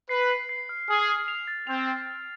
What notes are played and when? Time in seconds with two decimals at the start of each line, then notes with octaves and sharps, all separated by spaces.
0.09 B4 C7
0.30 C7
0.49 C7
0.69 F6
0.88 G#4 F6
1.08 F6
1.28 F7
1.48 A6
1.67 C4 F7
1.87 A6
2.07 A6